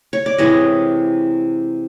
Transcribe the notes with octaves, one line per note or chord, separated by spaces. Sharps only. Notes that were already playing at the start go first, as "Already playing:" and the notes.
C#5
D5
C3 E3 G#3 C#5 D#5